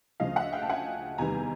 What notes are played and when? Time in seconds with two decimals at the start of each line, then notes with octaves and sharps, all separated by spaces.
0.20 D2 C#3 F3 D#5 F5
0.36 E5 F#5
0.53 F5 G5
0.62 A5
0.69 F#5 G#5
1.18 E2 C3 D#3 G3 B3 G#5 A#5